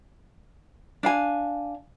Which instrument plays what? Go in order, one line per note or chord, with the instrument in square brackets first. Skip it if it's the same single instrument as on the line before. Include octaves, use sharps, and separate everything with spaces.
[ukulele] D4 F5 G#5